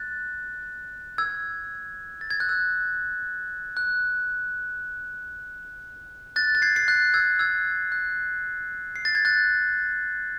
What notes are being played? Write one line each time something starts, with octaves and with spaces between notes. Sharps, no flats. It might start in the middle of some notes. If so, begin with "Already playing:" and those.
Already playing: F#6 A6
E6 G#6
A6
G#6
F#6
E6 G#6
F#6
F#6 A6
A6
G#6 C7
C7
F#6 A6
E6 G#6
E6 G#6
F#6
C7
A6
G#6
F#6 A6